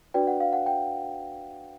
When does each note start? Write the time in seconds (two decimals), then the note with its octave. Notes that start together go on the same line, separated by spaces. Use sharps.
0.14 D4 F#4 B4 D5 G5
0.27 F#5
0.40 F5
0.53 F#5
0.66 G5